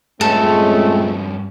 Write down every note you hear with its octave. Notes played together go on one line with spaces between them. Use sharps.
C#2 G2 G#3 A3 C4 C#4 A4